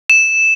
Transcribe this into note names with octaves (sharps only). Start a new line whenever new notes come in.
E7